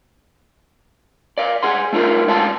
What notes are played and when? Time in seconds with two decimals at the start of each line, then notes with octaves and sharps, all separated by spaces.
1.38 D5 F5
1.63 G#4 F#5 C6
1.93 A3 D#4 F4 A#4 E5
2.28 G#2 D5 F5 A5 C6